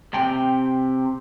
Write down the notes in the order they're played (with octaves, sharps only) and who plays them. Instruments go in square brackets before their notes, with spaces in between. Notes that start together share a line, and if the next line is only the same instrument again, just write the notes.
[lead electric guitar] C3 G5